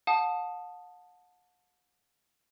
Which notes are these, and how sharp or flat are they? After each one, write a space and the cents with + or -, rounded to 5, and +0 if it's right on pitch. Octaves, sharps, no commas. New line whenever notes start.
F#5 -45 A5 +0 D#6 -10